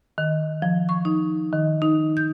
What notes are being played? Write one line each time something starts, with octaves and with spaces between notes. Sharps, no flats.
D#3
F3
C#6
D#4
D#3
D#4
G6